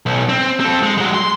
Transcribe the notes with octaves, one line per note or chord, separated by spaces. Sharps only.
B1
C4
C4 A4
G#3
F#3 G#3
C6